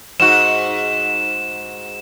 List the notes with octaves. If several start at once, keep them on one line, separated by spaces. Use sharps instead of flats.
G#2 F#4 E7